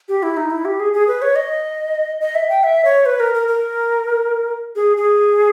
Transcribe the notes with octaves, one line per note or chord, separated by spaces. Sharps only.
G4
E4
D#4
E4
G4
G#4
G#4
B4
C#5
D#5
D#5
E5
G5
E5
C#5
B4
A#4
A#4
A#4
G#4
G#4